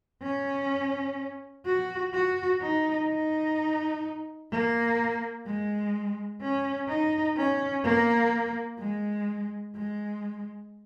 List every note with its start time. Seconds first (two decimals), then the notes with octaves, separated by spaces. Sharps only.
0.22 C#4
1.66 F#4
2.14 F#4
2.61 D#4
3.08 D#4
4.52 A#3
5.46 G#3
6.41 C#4
6.89 D#4
7.37 C#4
7.84 A#3
8.79 G#3
9.75 G#3